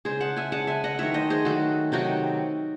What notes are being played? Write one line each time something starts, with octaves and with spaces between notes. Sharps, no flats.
C#3 G#3 G#4 C5
F#5 A5
E5 G#5
C#3 G#3 F#5 A5
E5 G#5
D#5 F#5
D#3 F#3 A3 C#5 E5
C5 D#5
G#4 C5
D#3 F#3 A3 F#4 A4
C3 D#3 F#3 A3 D#4 F#4